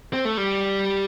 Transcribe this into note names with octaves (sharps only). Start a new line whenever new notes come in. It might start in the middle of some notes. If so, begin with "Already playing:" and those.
C4
A3
G3